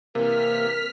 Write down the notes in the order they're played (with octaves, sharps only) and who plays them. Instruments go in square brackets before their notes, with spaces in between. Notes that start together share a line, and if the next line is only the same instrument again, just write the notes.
[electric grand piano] C3 E3 [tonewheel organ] A#3 [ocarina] A#4 [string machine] F6 B6